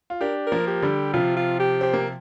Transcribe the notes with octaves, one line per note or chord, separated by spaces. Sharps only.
F4
D4 G4 A#4
A#4
F3 A#3
G4
D3 G3
C3 F3 F4
F4
G4
C4 G4
A#3